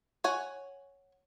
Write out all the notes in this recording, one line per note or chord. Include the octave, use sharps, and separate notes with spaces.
C#5 F#5 G#5